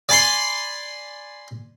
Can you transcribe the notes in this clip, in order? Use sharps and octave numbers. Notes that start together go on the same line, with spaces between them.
D5 G#5 B5 C6